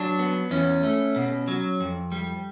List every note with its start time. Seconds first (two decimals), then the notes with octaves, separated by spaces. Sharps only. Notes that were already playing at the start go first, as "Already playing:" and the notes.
Already playing: F#3 D4
0.19 B3
0.50 E2 C#4
0.83 A3
1.16 B2
1.48 F#3
1.80 F2
2.12 G3